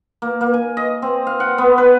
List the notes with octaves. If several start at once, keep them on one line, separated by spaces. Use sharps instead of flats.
A#3
A#3
G#5
D#5
C4
F5
F#5
B3
B4